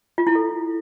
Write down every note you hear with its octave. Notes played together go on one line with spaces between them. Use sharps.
F4
E4
A4